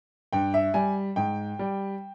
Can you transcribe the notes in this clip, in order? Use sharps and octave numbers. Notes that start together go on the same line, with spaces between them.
G2 G5
E5
G3 G#5
G#2 G5
G3